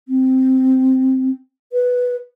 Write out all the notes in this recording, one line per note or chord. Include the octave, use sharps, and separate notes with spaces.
C4
B4